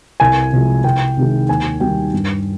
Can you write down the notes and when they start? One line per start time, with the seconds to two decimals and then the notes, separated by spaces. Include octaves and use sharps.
0.20 C2 G#5
0.53 C3 F3 G#3
0.84 C2 G5
1.17 C3 D#3 G#3
1.49 D#2 G#5
1.80 D#3 G3 G5
2.13 G2